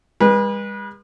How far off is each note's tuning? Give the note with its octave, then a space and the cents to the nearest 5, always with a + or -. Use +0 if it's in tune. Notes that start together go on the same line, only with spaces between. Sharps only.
G#3 -45 B4 -30